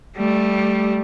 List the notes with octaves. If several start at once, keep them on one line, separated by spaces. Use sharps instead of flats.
G3 A3